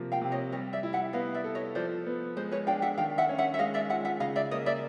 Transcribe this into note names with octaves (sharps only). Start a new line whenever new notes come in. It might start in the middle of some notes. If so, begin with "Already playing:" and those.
Already playing: C3 F3 A#3
F5 G5
C3
C#5 D#5
G3 C#5 D#5
D5 E5
E4
E5 F#5
B3 D#5 F5
D5 E5
A4
C#5 D#5
F3 C5 D5
B3
G#3 C5
B4 C#5
D4 F5 G5
E5 F#5
D#3 F5 G5
E5 F#5
C#4
E5 F#5
E5
G#3 D#5 F5
D5 E5
F4 E5 F#5
E5 F#5
C#3 D#5 F5
D5 E5
A#3 C#5 D#5
D5 E5